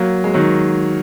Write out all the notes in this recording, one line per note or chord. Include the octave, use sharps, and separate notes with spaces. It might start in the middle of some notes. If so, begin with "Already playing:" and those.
Already playing: F#3 A#3
G#3
D#3 F#3